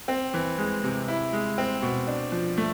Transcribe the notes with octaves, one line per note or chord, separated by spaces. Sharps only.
C4
E3
G#3
C3
E4
G#3
C4
B2
D4
F3
A3